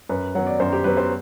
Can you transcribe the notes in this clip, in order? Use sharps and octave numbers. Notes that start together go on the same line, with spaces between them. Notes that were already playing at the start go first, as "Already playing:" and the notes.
F#2 B4
F#3 B3 F#5
D5
F#2 C5
G4
F#3 B3 B4
C5